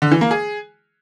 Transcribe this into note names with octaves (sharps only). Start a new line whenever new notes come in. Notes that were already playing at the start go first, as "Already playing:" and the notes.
D3
E3
A#3
G#4